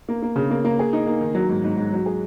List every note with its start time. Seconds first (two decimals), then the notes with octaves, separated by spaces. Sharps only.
0.09 A#3
0.22 A#3
0.36 C#3
0.50 A#3
0.65 A#3
0.79 G#4
0.93 D#4
1.07 A#3
1.21 D#3
1.35 F#3
1.49 G#2
1.64 G#2
1.77 G#2
1.92 F#3
2.06 G#4